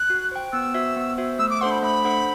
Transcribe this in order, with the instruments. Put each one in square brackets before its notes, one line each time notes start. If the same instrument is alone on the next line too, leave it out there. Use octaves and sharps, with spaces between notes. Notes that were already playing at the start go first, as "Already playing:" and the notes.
Already playing: [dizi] F#6
[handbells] F#4
C5 G5
[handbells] B3 [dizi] E6
[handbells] F#4 C5 E5
B3
F#4 C5 E5
[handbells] A3 [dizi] E6
[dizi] D6
[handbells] D4 A4 C5 F#5 [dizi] C6
[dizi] B5
[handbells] A3 [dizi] B5
[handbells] D4 A4 C5 F#5